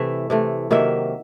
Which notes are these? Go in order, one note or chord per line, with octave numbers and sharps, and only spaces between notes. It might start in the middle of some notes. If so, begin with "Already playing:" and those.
Already playing: C3 E3 A3 E5
C3 E3 A3
C3 D#3 F#3 A#3 E5